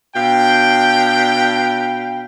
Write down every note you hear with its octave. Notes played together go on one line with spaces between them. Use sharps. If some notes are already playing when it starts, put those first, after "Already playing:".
B2 D4 F5 G5